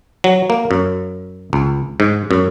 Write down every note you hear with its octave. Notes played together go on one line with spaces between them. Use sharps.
F#3
A#3
F#2
C#2
G#2
F#2